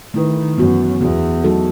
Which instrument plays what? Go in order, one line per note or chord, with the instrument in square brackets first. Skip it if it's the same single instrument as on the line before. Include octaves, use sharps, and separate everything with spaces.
[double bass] D#3 [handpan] A3 E4 B4
[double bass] F#2 [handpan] E3 B3 F#4
[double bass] E2 [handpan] E3 B3 F#4
[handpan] F#3 A3 D#4 F#4 A4